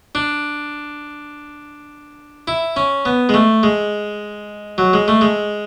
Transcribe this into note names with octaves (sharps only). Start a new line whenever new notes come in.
D4
E4
C#4
B3
G#3
A3
G#3
F#3
G#3
A3
G#3